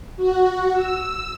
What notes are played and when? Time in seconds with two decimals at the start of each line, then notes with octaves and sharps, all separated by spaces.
0.17 F#4
0.73 E6